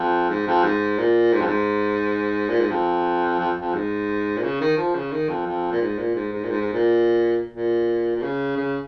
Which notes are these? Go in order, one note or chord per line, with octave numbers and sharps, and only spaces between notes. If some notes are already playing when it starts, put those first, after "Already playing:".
Already playing: F2
G#2
F2
G#2
A#2
G#2
F2
G#2
A#2
G#2
F2
F2
F2
G#2
A#2
C#3
D#3
F3
C#3
D#3
F2
F2
A#2
G#2
A#2
G#2
G#2
A#2
G#2
G#2
A#2
A#2
A#2
C#3
C#3